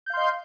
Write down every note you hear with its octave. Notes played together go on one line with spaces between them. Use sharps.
D#5 F5 C6 G6